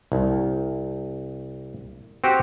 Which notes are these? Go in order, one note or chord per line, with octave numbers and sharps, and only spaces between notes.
C2
C4 F#4 G4